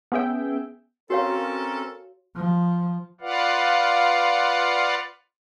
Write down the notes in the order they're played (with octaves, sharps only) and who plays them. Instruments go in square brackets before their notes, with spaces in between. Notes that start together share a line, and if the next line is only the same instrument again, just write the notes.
[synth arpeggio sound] B3 C#4 G#4 E5 G5
[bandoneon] C4 C#4 [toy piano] F#4 C#5 F5 [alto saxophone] A4 [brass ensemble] A#4
[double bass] F3
[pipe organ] F4 B4 D5 F5 F#5